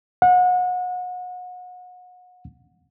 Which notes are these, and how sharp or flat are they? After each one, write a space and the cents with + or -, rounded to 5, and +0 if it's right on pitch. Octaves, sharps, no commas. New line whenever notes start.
F#5 -30